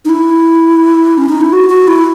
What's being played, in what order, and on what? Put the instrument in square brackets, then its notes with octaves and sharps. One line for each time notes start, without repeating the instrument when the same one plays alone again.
[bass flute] D#4
E4
C#4
D#4
E4
F#4
F#4
E4